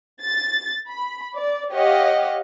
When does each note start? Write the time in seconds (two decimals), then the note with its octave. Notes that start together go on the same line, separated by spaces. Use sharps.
0.23 A6
0.89 B5
1.36 D5
1.72 G4 C#5 D#5 F5 F#5